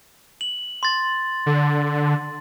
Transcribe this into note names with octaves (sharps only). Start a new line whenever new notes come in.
F#7
C6 A6
D3